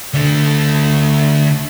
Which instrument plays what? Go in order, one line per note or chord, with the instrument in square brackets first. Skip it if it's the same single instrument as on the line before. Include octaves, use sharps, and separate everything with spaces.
[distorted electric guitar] D3 A3